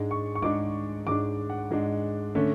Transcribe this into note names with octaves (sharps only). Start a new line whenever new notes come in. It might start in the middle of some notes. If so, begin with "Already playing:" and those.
Already playing: G#2 G#3 D4
C#6
C#6
G#2 G#3 D4 D6
G#2 G#3 D4 D6
F#5
G#2 G#3 D4
D3 A3 C#4